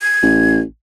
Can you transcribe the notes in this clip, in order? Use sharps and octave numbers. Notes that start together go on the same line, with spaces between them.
G#6
A1